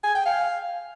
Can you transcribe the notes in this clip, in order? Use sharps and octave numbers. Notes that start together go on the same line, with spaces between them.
G#5
G5
F5